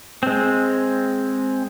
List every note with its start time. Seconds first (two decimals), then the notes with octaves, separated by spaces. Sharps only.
0.23 G#3 C4